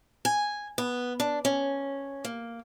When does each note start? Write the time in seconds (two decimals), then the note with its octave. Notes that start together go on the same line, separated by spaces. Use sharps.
0.25 G#5
0.78 B3
1.20 D4
1.45 C#4
2.25 A#3